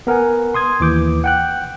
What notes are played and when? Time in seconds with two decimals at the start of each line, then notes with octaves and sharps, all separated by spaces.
0.07 B3 A#4 F#5 G#5
0.54 C6 D#6 G#6
0.80 D#2 E3 D6 G6
1.24 F#5 G5 F#6